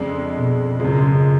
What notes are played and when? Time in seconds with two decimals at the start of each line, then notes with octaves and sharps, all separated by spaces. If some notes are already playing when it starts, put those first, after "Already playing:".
Already playing: F2 C#3 G#3 D4
0.35 B2
0.79 F#2 C#3 F3 G#3